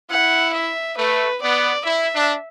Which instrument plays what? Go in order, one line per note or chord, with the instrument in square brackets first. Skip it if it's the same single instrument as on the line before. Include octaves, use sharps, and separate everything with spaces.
[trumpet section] E4 [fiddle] F#5
[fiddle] E5
[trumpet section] A3 [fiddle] B4
[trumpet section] B3 [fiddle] D5
[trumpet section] E4 [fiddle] E5
[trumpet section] D4